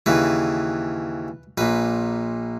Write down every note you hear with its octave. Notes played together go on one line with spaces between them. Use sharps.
D#2 C#3 E3 B4
A#1 A#2 B4